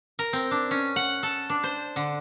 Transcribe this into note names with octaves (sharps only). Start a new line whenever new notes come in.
A#4
C4
D4
C#4
F#5
A4
D4
C5
D3